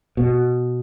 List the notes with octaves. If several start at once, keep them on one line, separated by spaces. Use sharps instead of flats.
B2